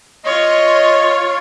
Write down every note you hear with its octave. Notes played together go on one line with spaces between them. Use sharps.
F4 C#5 D#5